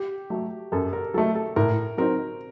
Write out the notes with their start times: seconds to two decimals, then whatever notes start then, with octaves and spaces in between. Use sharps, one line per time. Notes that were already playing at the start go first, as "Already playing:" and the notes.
Already playing: G4
0.30 F#3 A3
0.72 F#2 A4
0.93 A#4
1.14 F#3 A4
1.18 A3
1.35 A4
1.56 A2 A#4
1.98 F#3 C4 D#4 A#4